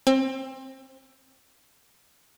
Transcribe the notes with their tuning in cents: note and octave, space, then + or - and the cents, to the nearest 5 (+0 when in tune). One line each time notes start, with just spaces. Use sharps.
C4 +25